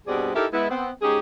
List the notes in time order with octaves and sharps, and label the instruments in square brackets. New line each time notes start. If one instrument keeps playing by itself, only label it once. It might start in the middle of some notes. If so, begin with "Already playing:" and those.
[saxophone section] G2 B2 G3 C4 G#4 D5
D#4 E4 G4 A4 A#4
G#3 B3 E4
B3 C4
G#2 C#4 D#4 G4 G#4